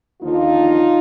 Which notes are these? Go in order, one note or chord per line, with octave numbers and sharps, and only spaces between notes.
D#2 D3 F3 A#3 D#4 F4